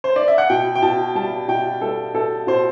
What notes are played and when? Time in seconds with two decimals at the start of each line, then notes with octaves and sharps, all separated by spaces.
0.04 C5
0.16 D5
0.28 E5
0.38 F#5
0.50 B2 G5
0.75 G5
0.82 B2 A5
1.15 G3 A5
1.48 B2 G5
1.81 G3 A4
2.14 B2 A4
2.47 B2 C5